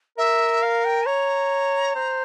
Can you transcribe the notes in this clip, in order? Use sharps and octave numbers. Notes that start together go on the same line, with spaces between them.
A#4 E5
F5
G5
C#5 A#5
C5